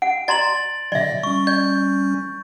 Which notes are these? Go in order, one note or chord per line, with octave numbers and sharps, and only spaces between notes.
F#5 D7
D5 A#5 C6 A6 F#7
B2 D3 F#3 D5 E5
G3 C#4 C#6
D5 G6